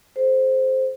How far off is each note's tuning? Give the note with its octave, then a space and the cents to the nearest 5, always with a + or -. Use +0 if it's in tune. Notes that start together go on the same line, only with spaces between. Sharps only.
G#4 +45 C5 +0